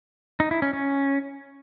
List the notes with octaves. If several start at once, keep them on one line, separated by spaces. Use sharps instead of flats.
D#4
E4
C#4
C#4